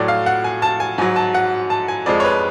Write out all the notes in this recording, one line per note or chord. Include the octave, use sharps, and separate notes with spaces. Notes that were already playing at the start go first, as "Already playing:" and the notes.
Already playing: A2 F#3 D5
F5
F#5
G#5
A5
G#5
G#2 F#3 G#5
A5
F#5
A5
G#5
F2 F3 G#3 D5
C#5
B4